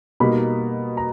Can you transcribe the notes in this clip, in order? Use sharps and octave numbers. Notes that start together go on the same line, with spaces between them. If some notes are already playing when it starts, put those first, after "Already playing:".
B2 G3 A#3 D#4 B5
A#5